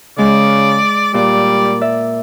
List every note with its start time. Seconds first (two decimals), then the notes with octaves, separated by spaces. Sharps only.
0.18 C#3 G#3 D5
1.14 A#2 G3 D5
1.81 D5 E5